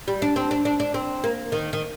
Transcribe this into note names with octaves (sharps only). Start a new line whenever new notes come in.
G3
D4
C4
D4
D4
D4
C4
A#3
D#3
D#3